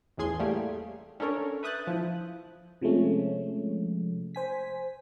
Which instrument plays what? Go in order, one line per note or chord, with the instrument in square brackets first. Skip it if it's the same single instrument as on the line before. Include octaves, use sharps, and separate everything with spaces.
[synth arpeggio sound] A1 E2 A2 G#4 C6 G#6
G3 A3 A#3 G4 G#4
C#4 D4 A4 A#4 C#5
B4 E5 D#6 F#6 G6 A6
F3 E4
[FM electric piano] C3 F3 G#3 A3 C#4
C5 G#5 B6